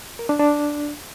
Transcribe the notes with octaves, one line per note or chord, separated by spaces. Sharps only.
A#4
D4
D4